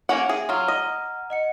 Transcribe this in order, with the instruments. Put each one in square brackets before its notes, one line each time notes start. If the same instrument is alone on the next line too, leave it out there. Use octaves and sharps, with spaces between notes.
[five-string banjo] A#3 C#4 F#5
[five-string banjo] G#4 [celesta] E5
[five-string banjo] F#3 F4 [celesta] F#5 A#5 F6
[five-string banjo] D#5
[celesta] D#5 F#5 C#7